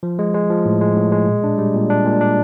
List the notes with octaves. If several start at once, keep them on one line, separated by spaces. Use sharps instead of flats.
F3
G#3
G#3
F3
A2
G#3
A2
G#3
A#2
D4
G3
A#2
D4
A#2
D4